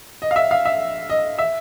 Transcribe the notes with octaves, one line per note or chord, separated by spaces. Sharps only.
D#5
F5
E5
F5
E5
D#5
E5